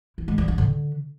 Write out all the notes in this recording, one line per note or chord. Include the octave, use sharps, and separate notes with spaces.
E4
G#3
G3
D4
D3